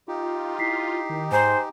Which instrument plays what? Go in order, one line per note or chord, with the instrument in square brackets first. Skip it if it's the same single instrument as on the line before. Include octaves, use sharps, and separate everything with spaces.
[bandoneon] D#4 G4 [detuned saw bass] F4
[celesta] E4 B6 C7
[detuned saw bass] D#3
[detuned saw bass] G#2 [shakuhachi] C5 [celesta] G#5 A#5 C6